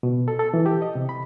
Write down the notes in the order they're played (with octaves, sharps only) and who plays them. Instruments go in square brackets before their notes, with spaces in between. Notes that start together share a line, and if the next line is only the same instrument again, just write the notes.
[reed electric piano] B2
A4
A4
E3
G4
D#5
C3
B5